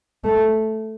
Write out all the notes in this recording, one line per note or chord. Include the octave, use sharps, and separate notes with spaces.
A3